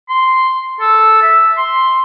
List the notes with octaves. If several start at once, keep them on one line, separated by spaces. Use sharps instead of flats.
C6
A4
E5
C6